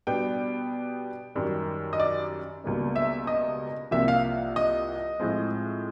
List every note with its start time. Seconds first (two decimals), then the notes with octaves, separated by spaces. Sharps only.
0.07 B2 G3 B3 D4 G5
1.35 F#2 D#3 G3
1.93 D#5
2.00 D5
2.64 C#2 B2 G3 A#3 D4
2.96 E5
3.27 D#5
3.91 C2 C3 F3 A#3 E5
4.08 F5
4.56 D#5
5.20 A2 F3 G#3 C4